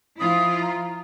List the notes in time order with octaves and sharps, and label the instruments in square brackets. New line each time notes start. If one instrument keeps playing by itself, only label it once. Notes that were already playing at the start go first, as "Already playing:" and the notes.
[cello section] F3 E4 F4 [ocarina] D#6
[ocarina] A#5